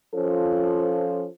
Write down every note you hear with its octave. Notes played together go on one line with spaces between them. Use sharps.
F3 C#4 F4 A4 C5